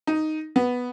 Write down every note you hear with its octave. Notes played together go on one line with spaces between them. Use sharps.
D#4
B3